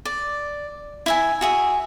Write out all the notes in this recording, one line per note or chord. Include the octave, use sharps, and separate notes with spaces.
D5
E4 E5 G#5
F#4 G#4 E5